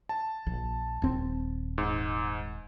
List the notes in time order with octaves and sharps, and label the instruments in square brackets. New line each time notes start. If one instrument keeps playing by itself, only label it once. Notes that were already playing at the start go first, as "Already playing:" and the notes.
[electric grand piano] A5
[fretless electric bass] A#1
D#1 C4
[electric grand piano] G#2